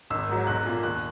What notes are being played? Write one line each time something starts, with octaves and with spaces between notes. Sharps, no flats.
G#1 E6
G#2 F#3
B1 F#6
A#2 A#3
D#2 F#6